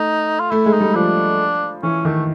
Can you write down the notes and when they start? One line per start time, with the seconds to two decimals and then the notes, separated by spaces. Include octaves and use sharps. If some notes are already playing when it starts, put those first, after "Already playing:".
Already playing: A3 D#4
0.40 F4
0.51 A3 E4
0.66 G#3
0.73 D#4
0.80 G3
0.95 F3 D4
1.83 E3 C#4
2.05 D#3 A3